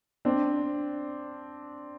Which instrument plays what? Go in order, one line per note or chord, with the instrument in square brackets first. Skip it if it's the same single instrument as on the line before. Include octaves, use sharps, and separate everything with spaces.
[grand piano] C4 D4